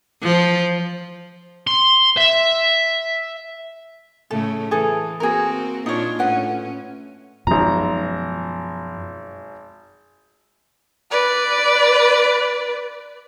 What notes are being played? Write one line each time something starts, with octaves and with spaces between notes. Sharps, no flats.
F3
C6
E5
A2 C#3 A3 A4
E3 G#4 A4
A#3 C4 F#4 G#4 A#4
A#2 D4 D#4 F4 C#5
A2 C#4 B4 F#5
G#1 F#2 B2 F3 A#5
B4 D5